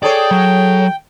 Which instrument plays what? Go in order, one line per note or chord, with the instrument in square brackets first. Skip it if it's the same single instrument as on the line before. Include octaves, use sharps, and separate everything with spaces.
[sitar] G#4 A4 C#5 [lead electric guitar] D5 [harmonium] G5
[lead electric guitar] F#3